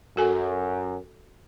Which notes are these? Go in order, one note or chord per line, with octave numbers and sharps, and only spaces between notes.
F#2 F#4 A4 G#5